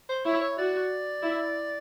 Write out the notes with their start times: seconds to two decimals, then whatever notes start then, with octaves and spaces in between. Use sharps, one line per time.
0.09 C5
0.25 E4 C#5
0.41 C#5
0.58 F#4 D5
1.23 E4